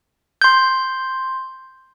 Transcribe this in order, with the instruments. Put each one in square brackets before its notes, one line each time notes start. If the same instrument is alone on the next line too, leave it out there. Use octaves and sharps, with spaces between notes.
[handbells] C6 G6